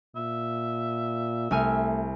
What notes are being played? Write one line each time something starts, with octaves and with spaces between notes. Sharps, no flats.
A#2 E5
C2 A3 G#5 F6